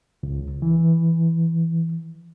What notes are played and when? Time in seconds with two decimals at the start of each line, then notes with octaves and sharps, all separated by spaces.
0.23 C#2
0.62 E3